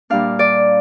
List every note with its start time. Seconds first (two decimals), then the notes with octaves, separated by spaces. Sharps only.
0.10 A#2 G3 D4 F5
0.39 D5